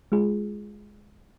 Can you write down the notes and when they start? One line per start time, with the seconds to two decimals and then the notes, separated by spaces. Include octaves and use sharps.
0.12 G#3 F4 G#4